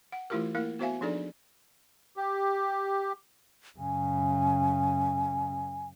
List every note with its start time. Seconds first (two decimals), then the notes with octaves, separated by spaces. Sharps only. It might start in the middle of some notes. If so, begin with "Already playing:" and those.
0.12 F#5
0.30 E3 A3 E4 F4 G4 A#4
0.55 A#3 E4 A#4 F5
0.79 B3 F#4 C5 E5 F5 G#5
1.01 F3 D4 D#4 G#4 A4 D5
2.17 G4
3.78 F#2 C#3 G#5